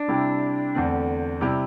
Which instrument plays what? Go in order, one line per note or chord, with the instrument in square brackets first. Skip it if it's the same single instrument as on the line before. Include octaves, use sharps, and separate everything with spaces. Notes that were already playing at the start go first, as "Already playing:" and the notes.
Already playing: [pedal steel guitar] D4
[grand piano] C3 G3 E4 G4
E2 D3 A3 C4
C3 G3 E4 G4